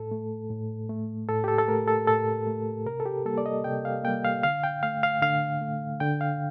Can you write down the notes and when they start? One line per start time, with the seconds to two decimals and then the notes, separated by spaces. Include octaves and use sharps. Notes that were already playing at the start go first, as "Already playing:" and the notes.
Already playing: A2 A4
0.11 A3
0.50 A2
0.89 A3
1.29 A2 A4
1.44 G4
1.48 A4
1.58 A4
1.68 A3 A#4
1.88 A4
2.07 A2 A4
2.47 A3
2.86 C3 A#4
3.00 A4
3.06 G4
3.26 G3 A#3 A4
3.38 D5
3.46 D#5
3.64 C3 G5
3.85 F5
4.04 G3 A#3 G5
4.25 F5
4.43 D3 F5
4.64 G5
4.83 A3 F5
5.03 F5
5.22 D3 F5
5.62 A3
6.00 D3 G5
6.21 F5